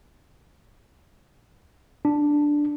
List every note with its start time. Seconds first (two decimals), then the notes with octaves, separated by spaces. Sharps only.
2.05 D4